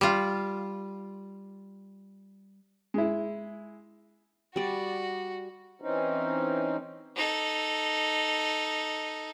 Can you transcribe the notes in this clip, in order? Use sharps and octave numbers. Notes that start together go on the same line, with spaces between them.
G3 F4
G#3 E4
G3 F#4 D5
E3 C4 C#4 D#4
D#4 A4